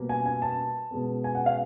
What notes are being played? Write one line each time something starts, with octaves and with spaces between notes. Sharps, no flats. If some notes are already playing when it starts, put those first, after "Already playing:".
Already playing: B2 G3 A#3
G#5
G#5
A5
B2 G#3 B3
G#5
F#5
F5